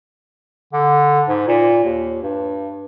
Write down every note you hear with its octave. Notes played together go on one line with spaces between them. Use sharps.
D3
G#2
A#2
D#2
G2